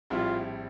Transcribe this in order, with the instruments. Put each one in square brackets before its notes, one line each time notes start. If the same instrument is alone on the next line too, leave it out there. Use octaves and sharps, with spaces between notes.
[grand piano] A#1 A2 G3 C4 E4 [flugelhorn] F4